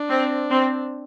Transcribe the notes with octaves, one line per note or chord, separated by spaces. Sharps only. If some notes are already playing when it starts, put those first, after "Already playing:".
Already playing: D4
C4
C4